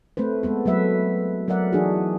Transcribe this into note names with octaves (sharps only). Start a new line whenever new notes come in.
A3 C4 B4 C5
G#3 B3 A4
F#3 A3 B4 E5
F#3 A#4 D5 E5 F#5
E3 D4 D#4 F#4 G#4